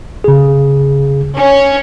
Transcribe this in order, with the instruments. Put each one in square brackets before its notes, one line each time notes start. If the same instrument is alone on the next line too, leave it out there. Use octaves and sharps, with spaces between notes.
[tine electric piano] C#3 G#4
[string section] C#4